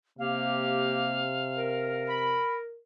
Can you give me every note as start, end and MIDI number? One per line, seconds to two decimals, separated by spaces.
0.19 2.42 48
0.19 1.29 58
0.19 1.29 67
0.19 2.09 77
1.57 2.78 70
2.09 2.57 83